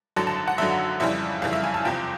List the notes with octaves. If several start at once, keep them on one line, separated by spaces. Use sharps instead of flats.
G#1 F#2 D3 F#3 A5
A5
F#5
G#1 F#2 D3 F#3 E5
F2 C#3 E3 G3 E5
F2 C#3 E3 G3 F5
E5
G#5
A5
F#1 E2 C3 F3 G5